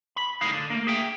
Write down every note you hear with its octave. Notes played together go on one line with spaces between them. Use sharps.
B5
C2 A2 G#3 D#4 F5
D3
A3 A#3
G#4 E5 G5